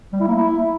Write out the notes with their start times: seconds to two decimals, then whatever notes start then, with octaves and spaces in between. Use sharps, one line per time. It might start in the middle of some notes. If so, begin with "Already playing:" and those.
0.13 G3
0.20 E4
0.28 A#3
0.35 E4